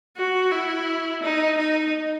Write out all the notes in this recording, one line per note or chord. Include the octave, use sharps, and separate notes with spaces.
F#4
E4
D#4
D#4